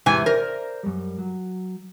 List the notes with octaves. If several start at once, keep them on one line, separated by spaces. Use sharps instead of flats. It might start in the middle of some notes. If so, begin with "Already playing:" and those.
E2 G#2 C3 E3 G#5
A#4 C5 D5
F#2 G3
F#3